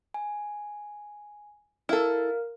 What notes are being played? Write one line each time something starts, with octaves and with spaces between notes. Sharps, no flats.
G#5
E4 A4 A#4 F5 F6